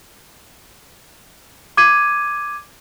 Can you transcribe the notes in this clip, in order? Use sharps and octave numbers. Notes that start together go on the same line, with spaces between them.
D6 G#6 D#7